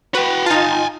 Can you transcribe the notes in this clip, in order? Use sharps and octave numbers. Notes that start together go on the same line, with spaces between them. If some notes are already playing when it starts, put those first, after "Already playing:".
F#4 B4 G5
D#4 F4 G#5 A5